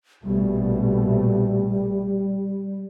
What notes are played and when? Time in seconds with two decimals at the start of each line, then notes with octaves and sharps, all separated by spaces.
0.24 A#1 B2 G3 A3